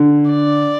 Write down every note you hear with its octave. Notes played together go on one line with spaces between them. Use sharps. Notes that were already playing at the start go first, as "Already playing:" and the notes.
Already playing: D3
D5